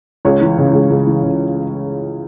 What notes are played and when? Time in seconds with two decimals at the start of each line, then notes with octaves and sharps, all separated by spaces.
0.25 C#2 C#5
0.41 E3
0.58 C#3
0.73 C#2
0.90 C#2
1.07 E3
1.23 C#3